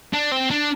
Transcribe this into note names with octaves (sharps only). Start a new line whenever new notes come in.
D4
C4
D4